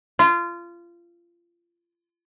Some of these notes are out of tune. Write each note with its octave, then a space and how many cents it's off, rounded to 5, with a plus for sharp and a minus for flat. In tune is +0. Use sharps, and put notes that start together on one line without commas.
F4 -25